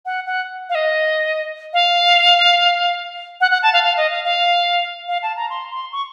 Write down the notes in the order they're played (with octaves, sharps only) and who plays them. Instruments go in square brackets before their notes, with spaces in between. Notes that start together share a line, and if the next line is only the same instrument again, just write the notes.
[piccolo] F#5
F#5
F5
D#5
F5
F#5
F#5
A5
F5
F5
D#5
F5
F5
F5
A5
A#5
C6
C6
C#6